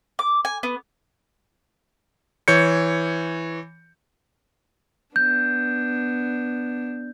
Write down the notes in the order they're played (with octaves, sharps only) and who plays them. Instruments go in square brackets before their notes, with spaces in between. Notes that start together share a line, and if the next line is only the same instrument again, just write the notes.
[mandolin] D6
G#5
B3
[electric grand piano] E3 C#5 G6 C#7
[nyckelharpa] B3 D4 [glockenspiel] G6